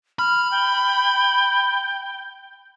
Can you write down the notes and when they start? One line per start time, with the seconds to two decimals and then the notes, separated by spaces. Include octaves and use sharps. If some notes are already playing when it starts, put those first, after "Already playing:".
0.19 B5 F6
0.52 G5